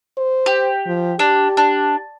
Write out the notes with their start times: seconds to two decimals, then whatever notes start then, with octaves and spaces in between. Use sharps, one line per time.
0.18 C5
0.46 G4
0.86 F3
1.19 D4 G4
1.57 D4